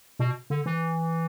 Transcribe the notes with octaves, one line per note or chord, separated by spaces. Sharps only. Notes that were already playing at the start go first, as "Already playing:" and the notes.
B2
D3
E3